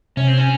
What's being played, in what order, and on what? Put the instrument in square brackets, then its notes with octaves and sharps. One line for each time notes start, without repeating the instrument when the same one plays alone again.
[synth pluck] C3 [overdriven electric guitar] C#4
[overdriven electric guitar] C4
C#4